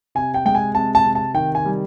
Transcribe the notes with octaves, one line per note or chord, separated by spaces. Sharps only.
C3 G#5
G5
G#3 G5
G#5
C3 A5
A5
C3
A5
D#3 G5
G#5
G3